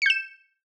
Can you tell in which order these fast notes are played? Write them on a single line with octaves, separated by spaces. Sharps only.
C#7 G6 E7